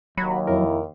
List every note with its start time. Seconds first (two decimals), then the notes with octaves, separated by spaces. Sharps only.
0.17 D#2 F#3 B5
0.47 F2 E4 A#4